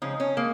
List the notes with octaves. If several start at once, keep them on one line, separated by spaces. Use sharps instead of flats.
C#3 F3 G#3 D#4
C#4
G#3 A#3